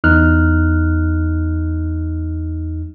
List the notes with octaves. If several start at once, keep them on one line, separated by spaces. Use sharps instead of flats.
E2 D#4 F6 F#6